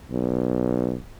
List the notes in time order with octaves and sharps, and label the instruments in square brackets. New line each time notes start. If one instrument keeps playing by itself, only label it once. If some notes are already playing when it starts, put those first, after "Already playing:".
[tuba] B1